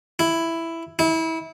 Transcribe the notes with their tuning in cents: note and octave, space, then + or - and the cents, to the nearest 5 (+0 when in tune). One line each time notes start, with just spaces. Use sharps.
E4 +5
E4 -25